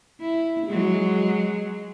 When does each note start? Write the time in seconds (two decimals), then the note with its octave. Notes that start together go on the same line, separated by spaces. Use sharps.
0.21 E4
0.66 F#3 G#3